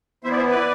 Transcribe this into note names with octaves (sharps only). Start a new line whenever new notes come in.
E3 B3 E4 C5 E5
D5
C5 E5
B4 D5